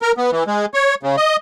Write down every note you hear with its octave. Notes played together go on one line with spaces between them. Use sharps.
A#4
B3
E3
G#3
C#5
C#3
D#5